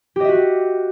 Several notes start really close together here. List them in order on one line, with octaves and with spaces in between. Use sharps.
G4 D#5 E5 F#4